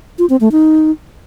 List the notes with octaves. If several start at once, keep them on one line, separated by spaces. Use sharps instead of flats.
F4
C4
A3
D#4